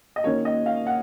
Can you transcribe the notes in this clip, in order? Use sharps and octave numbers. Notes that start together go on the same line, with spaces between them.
D#5
D#3 A#3 C#4 C#5
D#5
F5
F#5